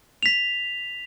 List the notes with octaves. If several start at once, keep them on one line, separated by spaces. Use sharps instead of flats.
B6 F7